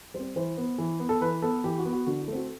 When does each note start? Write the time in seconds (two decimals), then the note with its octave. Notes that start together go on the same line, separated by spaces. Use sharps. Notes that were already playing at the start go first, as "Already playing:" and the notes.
0.14 G3 C4 C5
0.36 E3 C5
0.57 B3
0.78 E3
1.00 B3
1.09 A4
1.21 E3 B4
1.42 B3 A4
1.64 E3 G4
1.78 F#4
1.85 B3
1.92 F#4
2.06 D3 F#4
2.21 E4
2.28 A3
2.33 C4 F#4